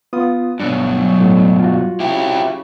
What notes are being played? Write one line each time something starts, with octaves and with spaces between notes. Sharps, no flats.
B3 F4 D#6
G2 B2 F#3 D4
A2
F4 F#4
C#3 E4 G4